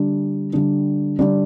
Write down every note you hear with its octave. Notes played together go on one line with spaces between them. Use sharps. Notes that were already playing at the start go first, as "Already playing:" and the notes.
Already playing: D3 G3 D4
D3 G3 D4
D3 G3 D4 D5